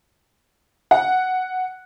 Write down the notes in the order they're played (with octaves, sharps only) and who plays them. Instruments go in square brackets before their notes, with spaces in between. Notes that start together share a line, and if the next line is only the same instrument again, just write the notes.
[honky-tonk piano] F#5